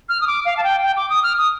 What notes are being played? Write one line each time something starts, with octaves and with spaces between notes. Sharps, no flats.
F6
D#6
D6
F5
A5
G5
G5
D6
D#6
F6
D#6